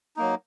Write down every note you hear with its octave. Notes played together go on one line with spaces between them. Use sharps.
F#3 A#3 D#4